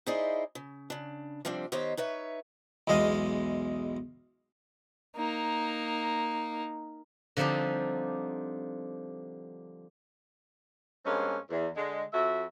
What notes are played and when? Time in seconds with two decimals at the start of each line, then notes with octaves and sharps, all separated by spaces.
0.07 D#4 E4 G#4 C5 D5 D#5
0.55 C#3
0.90 C#3 D4
1.45 C3 F3 G3 C4 D4
1.72 D#3 B3 G4 C5 C#5 D#5
1.97 D#4 B4 C#5 E5
2.87 B1 E2 G#3 D#5 F5
5.17 A#3 D#4
7.37 D3 F3 G3 C4 D#4 G4
11.05 G2 G#3 A#3 C4 C#4
11.49 E2
11.76 D3 G#3
12.13 F2 F#4 E5